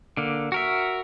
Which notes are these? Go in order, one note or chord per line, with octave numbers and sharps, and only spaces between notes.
D3 A#3
F#4 A#4 E5